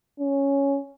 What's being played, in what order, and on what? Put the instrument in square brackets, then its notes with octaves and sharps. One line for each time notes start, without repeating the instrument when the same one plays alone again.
[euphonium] C#4